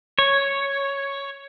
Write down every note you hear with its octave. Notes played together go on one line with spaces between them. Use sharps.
C#5